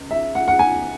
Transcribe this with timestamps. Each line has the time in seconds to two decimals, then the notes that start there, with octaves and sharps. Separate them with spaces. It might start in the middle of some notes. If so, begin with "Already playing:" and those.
Already playing: C#2
0.11 E5
0.35 F#5
0.48 F#5
0.59 G#5